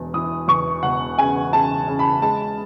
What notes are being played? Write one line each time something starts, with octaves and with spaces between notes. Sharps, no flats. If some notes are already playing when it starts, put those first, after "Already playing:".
Already playing: E1 E2
E3 D#6
E2 C#6
E1 F#5
C#3 G#5
C#3 A5
C#3
B5
G#3 A5